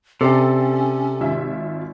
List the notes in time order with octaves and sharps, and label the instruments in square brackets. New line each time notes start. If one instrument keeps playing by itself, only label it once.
[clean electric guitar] C3 [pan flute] C#4 [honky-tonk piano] A4 D5 G5
[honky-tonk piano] G#1 F4 E5